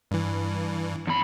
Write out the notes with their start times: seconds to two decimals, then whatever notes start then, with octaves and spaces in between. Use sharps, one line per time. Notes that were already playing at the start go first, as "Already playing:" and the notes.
0.11 G2 E3
1.07 E2 B5